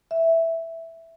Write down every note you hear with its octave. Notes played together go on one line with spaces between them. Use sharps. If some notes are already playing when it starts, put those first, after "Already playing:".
E5